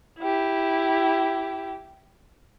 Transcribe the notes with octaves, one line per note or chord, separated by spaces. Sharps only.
E4 G4